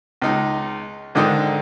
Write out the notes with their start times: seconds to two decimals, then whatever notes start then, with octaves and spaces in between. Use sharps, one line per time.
0.22 C#2 D#4
1.15 G#2 D3 D#3 D#4 D#5